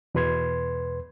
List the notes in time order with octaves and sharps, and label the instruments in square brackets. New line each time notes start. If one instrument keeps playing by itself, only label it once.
[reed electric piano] E2 B2 B4 C6 G#6